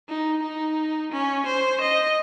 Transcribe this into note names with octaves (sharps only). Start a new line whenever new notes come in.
D#4
D#4
C#4
C5
D#5